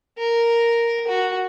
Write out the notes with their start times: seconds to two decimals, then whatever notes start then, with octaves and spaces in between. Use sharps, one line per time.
0.18 A#4
1.07 F#4